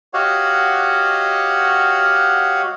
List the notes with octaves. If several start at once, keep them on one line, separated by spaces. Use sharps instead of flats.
F#4 G4 C#5 D#5 F5 F#5